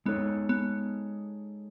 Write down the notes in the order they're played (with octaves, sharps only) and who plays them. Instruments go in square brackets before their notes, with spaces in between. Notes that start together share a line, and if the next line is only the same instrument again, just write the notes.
[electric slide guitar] G#3 D#4 A4 C#5 [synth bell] B3
[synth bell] B3